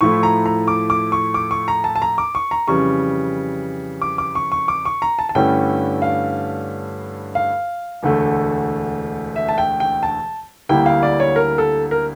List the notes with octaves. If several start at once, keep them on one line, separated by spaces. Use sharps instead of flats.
A2 F3 A3 E4 C#6
A#5
A#5
D6
D6
C#6
D6
C#6
A#5
A5
A5
A#5
D6
C#6
A#5
F2 C#3 E3 G3 C#6
D6
D6
C#6
C#6
D6
C#6
A#5
A5
A5
G2 D3 A3 C#4 E4 G5
F5
F5
E1 D2 D3 A3
E5
A5
G5
G5
A5
D2 D3 G3 A#3 E4 G5
F5
D5
C#5
A#4
A4
A#4